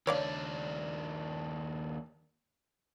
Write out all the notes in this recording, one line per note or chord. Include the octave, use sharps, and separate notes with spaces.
D#2 D4 C#5 D5 F5